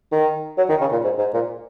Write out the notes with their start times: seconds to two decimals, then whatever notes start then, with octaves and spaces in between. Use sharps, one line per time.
0.12 D#3
0.58 F#3
0.69 D#3
0.81 C#3
0.92 A#2
1.04 G#2
1.18 G#2
1.34 A#2